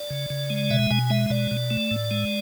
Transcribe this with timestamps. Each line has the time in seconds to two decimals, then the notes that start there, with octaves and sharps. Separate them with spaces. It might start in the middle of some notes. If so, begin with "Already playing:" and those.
Already playing: D5
0.10 C#3
0.30 C#3
0.50 G#3
0.71 B2 E5
0.91 B2 G#5
1.10 G#3 E5
1.30 B2 D5
1.51 B2
1.70 A3
1.91 A2
2.11 G#3